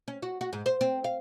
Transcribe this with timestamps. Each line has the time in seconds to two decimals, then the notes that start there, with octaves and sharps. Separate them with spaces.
0.08 C#4
0.22 F#4
0.41 F#4
0.53 G#2
0.66 C5
0.81 C4
1.04 F5